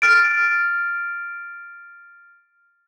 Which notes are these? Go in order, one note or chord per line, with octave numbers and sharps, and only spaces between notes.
F6 A6 D7